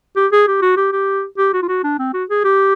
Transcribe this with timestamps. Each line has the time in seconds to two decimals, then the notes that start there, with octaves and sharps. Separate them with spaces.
0.16 G4
0.32 G#4
0.47 G4
0.62 F#4
0.77 G4
0.92 G4
1.38 G4
1.53 F#4
1.62 F4
1.69 F#4
1.84 D4
1.99 C4
2.14 F#4
2.29 G#4
2.44 G4